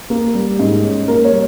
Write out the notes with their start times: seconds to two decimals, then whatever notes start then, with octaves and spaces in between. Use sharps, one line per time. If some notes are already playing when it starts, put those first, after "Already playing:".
0.10 A#3
0.34 G3
0.59 G#2
0.84 C#4
1.08 A#3 A#4
1.25 C#5
1.32 G3